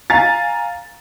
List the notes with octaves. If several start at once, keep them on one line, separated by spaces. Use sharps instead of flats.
F5 G#5 A#5 A6